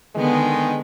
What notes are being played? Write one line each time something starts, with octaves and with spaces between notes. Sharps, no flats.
D3 D#3 G#3 B3